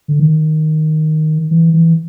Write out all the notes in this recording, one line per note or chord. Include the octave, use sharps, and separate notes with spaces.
D3
D#3
E3
E3